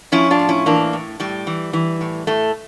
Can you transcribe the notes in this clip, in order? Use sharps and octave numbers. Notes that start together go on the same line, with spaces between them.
F3 C#4 E4
D4 F4
A2
C#4 E4
E3 A#3 D4
A2
A2 G3
E3
E3
A2
A2 A3